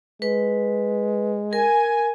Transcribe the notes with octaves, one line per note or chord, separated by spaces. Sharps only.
G#3 B4
A#4 G#5